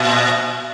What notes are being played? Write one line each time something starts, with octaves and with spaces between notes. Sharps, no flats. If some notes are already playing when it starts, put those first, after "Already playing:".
Already playing: A#2